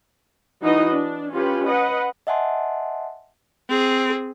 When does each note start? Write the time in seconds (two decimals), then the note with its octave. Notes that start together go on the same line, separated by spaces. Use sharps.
0.62 E3 D#4 F#4 B4 D#5
0.91 D4
1.31 C#4 F4 G4 B4
1.66 B4 D#5 F#5
2.27 D#5 E5 F#5 G#5 A5 C6
3.69 C4 G#4